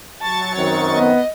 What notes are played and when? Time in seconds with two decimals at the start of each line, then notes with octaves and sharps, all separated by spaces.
0.21 F#3 A5 C#6 A6
0.55 F#2 D#3 C4 C#5
0.93 B3 D#5